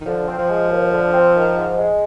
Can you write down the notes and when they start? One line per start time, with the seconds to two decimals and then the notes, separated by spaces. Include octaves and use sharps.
0.01 D#3
0.06 D3 F3
0.28 C4
0.38 F3
0.49 G#3
0.70 D#2
0.92 D3
1.13 C4
1.35 D#3
1.55 G#2
1.77 G#3